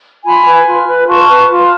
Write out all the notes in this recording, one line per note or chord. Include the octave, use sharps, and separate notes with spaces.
F4 G#5 B5
B4
F4
B4
F4 A5 C#6
B4
F4